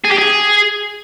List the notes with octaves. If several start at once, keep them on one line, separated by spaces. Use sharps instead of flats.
G#4
G4
G#4